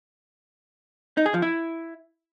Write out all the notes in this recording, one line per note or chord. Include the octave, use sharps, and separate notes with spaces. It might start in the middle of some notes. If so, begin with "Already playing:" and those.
D#4
G#4
F3
E4